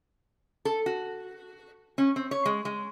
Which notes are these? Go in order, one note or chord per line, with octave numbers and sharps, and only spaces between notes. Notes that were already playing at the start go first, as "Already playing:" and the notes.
A4
F#4
C#4
C4
C#5
G#3
G#3